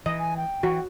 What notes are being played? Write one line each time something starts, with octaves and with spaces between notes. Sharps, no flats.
E3 D#5
G#5
G5
E3 F#4